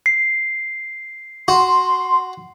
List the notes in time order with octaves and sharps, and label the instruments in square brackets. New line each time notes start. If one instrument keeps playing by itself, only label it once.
[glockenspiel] C7
[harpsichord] F#4 [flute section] C6